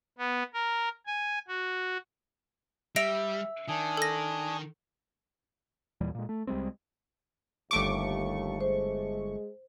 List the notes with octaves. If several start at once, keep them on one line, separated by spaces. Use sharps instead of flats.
B3
A#4
G#5
F#4
G3 E5 A#6 D7 F7
D#3 D4 G#5 D#6
A4 A#6
D#2 A#2 E3 G3
A#2 G#3
A3
C2 G3 G#3 C4
G1 D#2 A3 C#6 D6
G#3 C5